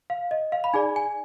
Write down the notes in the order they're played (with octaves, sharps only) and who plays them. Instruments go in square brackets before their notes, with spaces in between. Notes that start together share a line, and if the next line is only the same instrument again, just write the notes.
[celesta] F5
D#5
F5
B5
D#4 G#4 D5 G#5
G#5